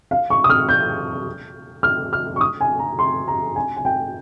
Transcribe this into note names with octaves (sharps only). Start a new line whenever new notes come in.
F5
C#6
D#6
F6
G6
F6
F6
C#6
D#6
G#5
A#5
C6
A#5
G#5
G#5
G5